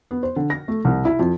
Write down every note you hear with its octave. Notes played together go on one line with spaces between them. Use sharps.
B3
C5
D3
A#6
A3
C2
E4
F2